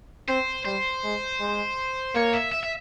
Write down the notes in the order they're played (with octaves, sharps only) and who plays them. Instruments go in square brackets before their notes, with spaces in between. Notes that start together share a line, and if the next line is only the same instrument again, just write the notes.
[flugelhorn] C4 [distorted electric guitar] C5
[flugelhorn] G3 [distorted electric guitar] C5
[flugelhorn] G#3
G#3
[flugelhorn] A#3 [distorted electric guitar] C#5
[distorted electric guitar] E5
E5
E5